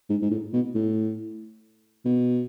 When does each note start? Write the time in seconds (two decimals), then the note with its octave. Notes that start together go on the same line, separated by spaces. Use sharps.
0.09 G#2
0.22 G#2
0.31 A2
0.54 B2
0.75 A2
2.05 B2